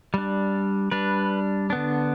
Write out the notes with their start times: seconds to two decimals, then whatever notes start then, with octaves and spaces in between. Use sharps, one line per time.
0.14 G3 D4
0.91 G3 D4 B4
1.70 D3 B3 D4